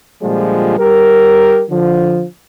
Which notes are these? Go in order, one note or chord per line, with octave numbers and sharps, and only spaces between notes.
A#2 D3 F3 G3 G#3
G3 G4 A#4
D3 F3